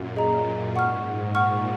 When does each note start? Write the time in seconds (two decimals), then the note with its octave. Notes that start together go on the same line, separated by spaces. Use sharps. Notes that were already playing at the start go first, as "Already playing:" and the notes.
Already playing: F#2 A#2
0.16 G#4 D#5 A#5
0.76 G#2 F#5 C#6 F6
1.35 A#2 F#5 C#6 F6